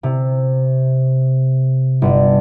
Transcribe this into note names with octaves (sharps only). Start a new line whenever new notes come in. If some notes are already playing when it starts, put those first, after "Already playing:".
C3
G1